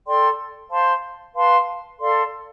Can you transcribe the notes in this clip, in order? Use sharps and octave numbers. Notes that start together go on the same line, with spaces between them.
A4 D5 G5 C6
C5 F5 A5 C6
B4 F5 A5 C6
A4 D5 F5 C6